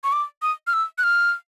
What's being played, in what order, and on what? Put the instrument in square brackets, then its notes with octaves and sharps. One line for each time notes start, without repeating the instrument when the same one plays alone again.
[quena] C#6
D6
D#6
F6
E6
F#6
F6